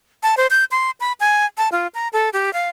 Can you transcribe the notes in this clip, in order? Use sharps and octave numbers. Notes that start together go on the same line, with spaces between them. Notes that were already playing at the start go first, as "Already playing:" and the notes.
A5
C5
G6
C6
B5
G#5
A5
F4
A#5
A4
G4
F5